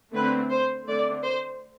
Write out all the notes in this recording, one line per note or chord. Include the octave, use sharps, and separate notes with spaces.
D3 A3 C4 B4
C5
D3 A3 C4 D5
C5